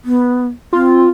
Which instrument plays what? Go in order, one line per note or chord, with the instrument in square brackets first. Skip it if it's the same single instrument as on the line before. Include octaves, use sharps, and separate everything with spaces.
[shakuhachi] B3
[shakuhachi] C4 [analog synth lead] F4